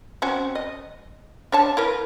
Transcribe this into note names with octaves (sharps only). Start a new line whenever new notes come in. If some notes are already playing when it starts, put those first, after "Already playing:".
C4 C#4 F#4
D#5
D4 C#5 A5
E4 A#4 B4